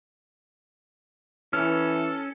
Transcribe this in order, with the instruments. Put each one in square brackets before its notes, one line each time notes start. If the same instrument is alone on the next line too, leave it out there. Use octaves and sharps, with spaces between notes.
[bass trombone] E3 [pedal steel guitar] C#4 [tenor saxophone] A4 [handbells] F6